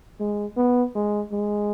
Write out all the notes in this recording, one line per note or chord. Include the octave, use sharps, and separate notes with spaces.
G#3
B3
G#3
G#3